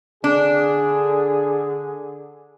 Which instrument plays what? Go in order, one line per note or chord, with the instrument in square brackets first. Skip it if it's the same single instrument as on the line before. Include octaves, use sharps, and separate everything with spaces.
[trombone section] D3 G#4 [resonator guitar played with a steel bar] D4